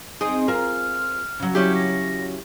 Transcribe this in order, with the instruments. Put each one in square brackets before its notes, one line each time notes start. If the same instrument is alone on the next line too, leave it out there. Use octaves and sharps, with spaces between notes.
[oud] C4 D#4 [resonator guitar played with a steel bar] G#4 [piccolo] D#6
[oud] F4 A#4 C5 [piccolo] F6
[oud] C#3 F#3
[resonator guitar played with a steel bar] C#4 E4 G4 [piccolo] G6
[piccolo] A#6